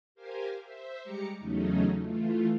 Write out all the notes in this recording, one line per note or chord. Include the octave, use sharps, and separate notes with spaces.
G4 A#4 C5 F5 G#5
C5 E5
G3 G#3 G4 A#5 D6 C#7
E2 C#3 F#3 A3 C#4 D#4
E3 A3 F4